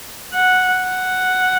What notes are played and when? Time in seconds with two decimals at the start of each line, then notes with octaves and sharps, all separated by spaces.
0.34 F#5
0.89 F#5